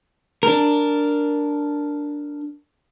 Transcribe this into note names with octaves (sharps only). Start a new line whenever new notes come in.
D4 A#4